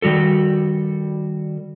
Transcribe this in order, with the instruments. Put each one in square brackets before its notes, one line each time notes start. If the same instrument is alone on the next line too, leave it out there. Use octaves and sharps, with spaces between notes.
[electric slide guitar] D#3 G3 F#4 A4